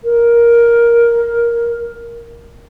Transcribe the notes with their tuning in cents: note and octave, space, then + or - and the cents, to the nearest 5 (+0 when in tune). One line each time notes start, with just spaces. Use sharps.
A#4 +10